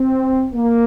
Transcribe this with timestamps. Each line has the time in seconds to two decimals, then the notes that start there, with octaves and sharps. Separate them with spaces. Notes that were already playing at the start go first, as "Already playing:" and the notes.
Already playing: C4
0.54 A#3